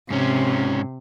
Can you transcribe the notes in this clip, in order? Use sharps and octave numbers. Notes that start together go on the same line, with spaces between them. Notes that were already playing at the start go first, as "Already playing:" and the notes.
G#2 C3 C#4